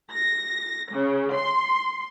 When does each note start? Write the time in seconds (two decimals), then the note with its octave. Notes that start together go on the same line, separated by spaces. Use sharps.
0.12 A#6
0.92 C#3
1.33 C6